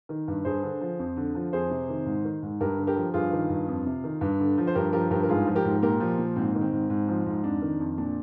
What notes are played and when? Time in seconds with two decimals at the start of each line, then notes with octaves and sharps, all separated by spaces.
0.09 D#3
0.28 G2
0.45 G2 G#4 C5
0.63 D3
0.81 F3
0.99 F2
1.17 D3
1.35 F3
1.53 F2 G#4 C5
1.70 C3
1.89 D#3
2.06 G#2
2.25 D#3
2.43 G#2
2.61 G2 G4 A#4
2.78 D3
2.87 G4 A#4
2.96 F3
3.14 G2 F4 G#4
3.32 D#3
3.49 G2
3.68 F2
3.86 C3
4.04 D#3
4.21 G2
4.39 D3
4.58 F3
4.67 C5
4.75 G2 G4 A#4
4.93 F3 G4 A#4
5.11 G2 G4 A#4
5.23 A#4
5.29 G#2 F4 G#4
5.47 F3
5.55 G4 A#4
5.65 G#2
5.82 A#2 G4 A#4
6.00 F3
6.19 A#2
6.36 G#2 C4
6.55 D#3
6.61 C4
6.73 G#2
6.90 G#2
7.08 F3
7.26 G#2
7.44 F2 D4
7.62 D#3
7.80 F2
7.98 A#2 D4